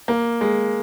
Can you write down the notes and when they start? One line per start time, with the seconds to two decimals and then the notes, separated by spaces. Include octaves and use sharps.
0.08 A#3
0.41 G#3